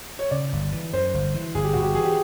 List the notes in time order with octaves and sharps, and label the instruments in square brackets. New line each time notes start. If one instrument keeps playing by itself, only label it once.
[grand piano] C#5
[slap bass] C#3 [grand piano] D5
[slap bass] G1
E3
[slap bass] F#2 [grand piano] C5
[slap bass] G1
E3
[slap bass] G1 [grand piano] G#4
[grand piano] G4
[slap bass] G1 [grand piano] F#4
[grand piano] G4
[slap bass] E3 [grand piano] G#4
[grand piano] G4